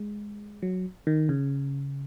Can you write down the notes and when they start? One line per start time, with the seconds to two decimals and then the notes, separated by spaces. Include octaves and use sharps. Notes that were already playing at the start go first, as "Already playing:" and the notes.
Already playing: G#3
0.62 F#3
1.07 D#3
1.29 C#3